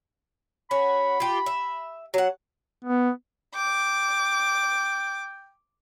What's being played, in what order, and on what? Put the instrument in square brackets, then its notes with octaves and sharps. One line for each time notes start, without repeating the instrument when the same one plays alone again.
[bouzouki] C#4 F#4 [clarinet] B5
[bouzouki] F4 G4
E5
F#3 F#5
[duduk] B3
[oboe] G5 [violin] D6